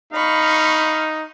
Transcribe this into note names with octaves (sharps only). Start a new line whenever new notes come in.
D#4 F5 B5 C#6